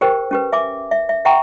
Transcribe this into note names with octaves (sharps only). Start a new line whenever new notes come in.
G4 G#4 A#4 C5 G5
C#4 G4 B4
E5 G#5 D6
E5
E5
E5 F#5 G5 A#5 C#6